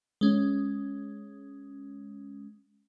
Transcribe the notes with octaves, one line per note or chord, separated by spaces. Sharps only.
G#3 C#4